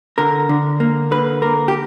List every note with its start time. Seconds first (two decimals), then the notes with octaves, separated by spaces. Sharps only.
0.18 D3 A#4
0.49 D3
0.80 A#3
1.11 D3 B4
1.42 A#3 A#4
1.68 G4